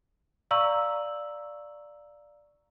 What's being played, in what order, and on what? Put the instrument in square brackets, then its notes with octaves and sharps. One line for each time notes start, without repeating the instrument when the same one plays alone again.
[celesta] D5 F5 A#5 C#6 E6 F#7